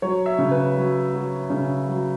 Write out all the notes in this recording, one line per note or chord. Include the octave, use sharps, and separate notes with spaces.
F#3 C#5
E5
C#3
B4
F#3
F#3
C#3
F#3